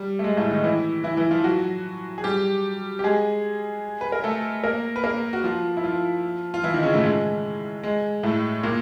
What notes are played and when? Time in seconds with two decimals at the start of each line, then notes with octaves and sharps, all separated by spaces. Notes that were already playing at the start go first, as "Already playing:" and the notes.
Already playing: G3
0.19 A3
0.24 G#3
0.37 A2 A3
0.51 D#3 D#4
0.64 E3 E4
1.04 E3 E4
1.17 E3 E4
1.31 F3 F4
1.44 F#3 F#4
2.18 G#4
2.24 G3 G4
2.99 G4
3.04 G#3 G#4
4.01 B4
4.12 A#4
4.24 A3 A4
4.64 A#3 A#4
4.96 B4
5.04 A#3 A#4
5.33 F#4
5.44 F3 F4
5.77 E4
5.84 F3 F4
6.54 F4
6.63 E3 E4
6.74 D#3 D#4
6.83 C#3 C#4
6.93 A2 A3
7.04 G#3
7.83 G#3
8.23 A2 A3
8.63 A#2 A#3